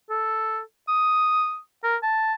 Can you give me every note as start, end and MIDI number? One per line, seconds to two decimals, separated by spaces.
0.10 0.60 69
0.88 1.59 87
1.84 1.97 70
2.03 2.33 81